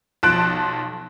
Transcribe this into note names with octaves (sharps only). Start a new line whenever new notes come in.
B1 F3 A5 C6 F#6 D7